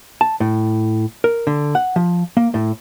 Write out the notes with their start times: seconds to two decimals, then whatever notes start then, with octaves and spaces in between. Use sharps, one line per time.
0.21 A5
0.40 A2
1.24 A#4
1.47 D3
1.75 F#5
1.96 F3
2.37 A#3
2.54 A2